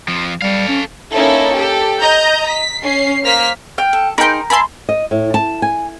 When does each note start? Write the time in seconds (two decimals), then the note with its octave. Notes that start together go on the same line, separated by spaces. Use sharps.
0.08 F2 F3
0.42 G3 A4 F5
0.68 C#4
1.12 A#3 C#4 D#4 E4 A4
1.54 G4 A4
1.99 D#5 A#5 G6
2.47 B6
2.83 C#4 C7
3.24 A#3 C5 F6 B6
3.78 G5 F6
3.93 A4
4.18 D#4 G#4 A#4 G5 B5 C6
4.50 E5 G#5 A5 B5 C6
4.89 D#5
5.11 A2
5.34 A5
5.62 G#5